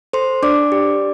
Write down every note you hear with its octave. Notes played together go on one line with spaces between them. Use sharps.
A4 C5 C6
D4 D5 D6
G4